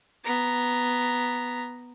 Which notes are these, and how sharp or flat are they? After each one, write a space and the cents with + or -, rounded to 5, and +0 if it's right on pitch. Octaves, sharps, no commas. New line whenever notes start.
B3 +0 A#5 +0